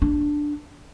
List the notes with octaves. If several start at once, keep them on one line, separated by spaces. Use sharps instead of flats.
D4